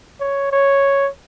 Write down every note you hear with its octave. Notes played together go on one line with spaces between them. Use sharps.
C#5
C#5